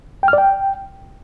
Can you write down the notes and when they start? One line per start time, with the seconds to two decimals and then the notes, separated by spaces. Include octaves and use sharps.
0.23 G5
0.28 F6
0.33 D5
0.38 G5